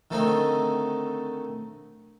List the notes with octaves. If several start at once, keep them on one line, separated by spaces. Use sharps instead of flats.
D3 D#3 A3 C4 D#4